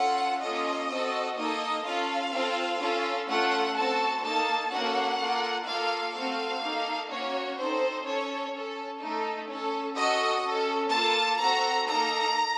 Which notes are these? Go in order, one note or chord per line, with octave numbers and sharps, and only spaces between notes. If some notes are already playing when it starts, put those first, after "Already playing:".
Already playing: C#4 F4 A4 F#5
A#3 C#4 F4 A4 D#5
C4 F#4 A4
A#3 D#4 A4 D#5
C#4 F4 A4 F5
C4 F4 A4
C#4 F4 A4
A3 C#4 F4 A4 F#5
C4 F#4 A4 A5
A#3 D#4 A4 A5
A#3 C#4 F#4 A4 F#5
A#3 F4 A4
A#3 F4 A4 F5
A3 C4 F#4 A4 F5
A#3 D#4 A4
A#3 C#4 F#4 C#5
C4 D#4 A4 C5
C#4 A4 C#5
C#4 A4
A3 D#4 A4
C#4 A4
C#4 F#4 A4 D#5
C#4 A4
A#3 F4 A4 A5
C4 F#4 A4 A#5
A#3 D#4 A4 A#5